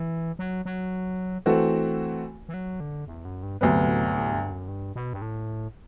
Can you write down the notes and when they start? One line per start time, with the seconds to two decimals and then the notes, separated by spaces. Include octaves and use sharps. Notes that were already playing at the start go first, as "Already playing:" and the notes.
Already playing: E3
0.39 F#3
0.65 F#3
1.46 E3 A3 C4 F#4 A4
2.49 E3
2.54 F#3
2.80 D3
3.07 E2
3.25 F#2
3.43 G2
3.61 D2 G2 C3 F#3 B3
3.87 A2
4.04 G2
4.15 A2
4.33 G2
4.51 F#2
4.68 G2
4.95 B2
5.13 G2
5.22 A2